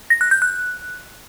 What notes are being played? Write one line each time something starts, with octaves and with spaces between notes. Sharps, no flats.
A#6
F#6
G6
F#6